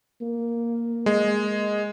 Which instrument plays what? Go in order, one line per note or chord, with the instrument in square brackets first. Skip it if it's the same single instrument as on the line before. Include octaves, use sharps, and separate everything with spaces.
[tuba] A#3
[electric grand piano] G#3